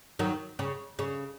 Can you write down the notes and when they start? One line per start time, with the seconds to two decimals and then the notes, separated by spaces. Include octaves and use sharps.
0.19 D#3 F#3
0.59 C#3
0.99 C#3